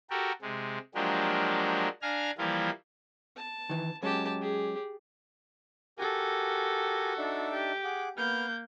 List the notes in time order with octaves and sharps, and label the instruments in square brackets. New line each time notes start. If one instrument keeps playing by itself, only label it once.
[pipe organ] F#4 G4 A4 A#4
C3 G#3
F3 F#3 G#3 A#3 D4 G4
D4 F5 G#5 A#5 F6
E3 F3 G3 A#3 E4 F4
[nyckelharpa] A5
[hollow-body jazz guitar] D#3 E3
[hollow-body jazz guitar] F#3 G#3 C#4 [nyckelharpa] G4 A5
[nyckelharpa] G4 G#4
[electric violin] F#4 A4 [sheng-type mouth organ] G4 A#4 G#5
[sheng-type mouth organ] D4 D#4 E5
[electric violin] G4
[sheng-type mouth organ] G#4 F#5 D6
[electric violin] A#3 G6 [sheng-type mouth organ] B3 F6